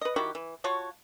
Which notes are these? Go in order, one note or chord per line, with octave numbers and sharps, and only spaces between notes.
B4 D#5
D#3 E4 F#4 G4
E3
F4 F#4 C#5 A5